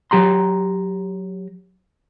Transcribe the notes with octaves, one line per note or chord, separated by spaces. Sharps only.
F#3 G4 A#5 C6